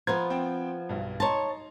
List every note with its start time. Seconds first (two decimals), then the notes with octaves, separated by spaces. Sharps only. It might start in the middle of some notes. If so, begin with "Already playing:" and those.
0.07 F3 B3 A#5 C6 G#6
0.30 C4 G5
0.89 B1 G2
1.20 D#4 C#5 A5 A#5 C6